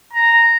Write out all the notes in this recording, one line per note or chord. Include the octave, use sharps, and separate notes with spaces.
A#5